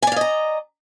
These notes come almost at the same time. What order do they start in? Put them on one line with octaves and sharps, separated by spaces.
G#5 D5 F5 D#5 A#5